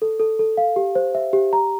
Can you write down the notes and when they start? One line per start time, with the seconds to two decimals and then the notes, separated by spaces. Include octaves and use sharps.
0.02 A4
0.20 A4
0.39 A4
0.57 F5
0.76 G4
0.95 C5
1.15 E5
1.33 G4
1.53 A#5